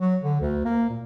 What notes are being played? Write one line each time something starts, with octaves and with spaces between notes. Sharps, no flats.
F#3
D3
D2
A#3
A#2